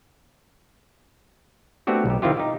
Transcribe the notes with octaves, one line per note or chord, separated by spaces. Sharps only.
A3 B3 C4 D4 F#4 G4
B1 G4
D#3 C4 E4 F4 G4
D#4 G4